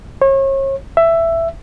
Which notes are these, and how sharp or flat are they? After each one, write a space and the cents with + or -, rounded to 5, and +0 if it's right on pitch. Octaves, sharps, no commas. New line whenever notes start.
C#5 -35
E5 +10